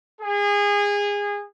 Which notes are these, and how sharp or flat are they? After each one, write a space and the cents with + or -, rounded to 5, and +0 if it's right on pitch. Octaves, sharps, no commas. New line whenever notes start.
G#4 -25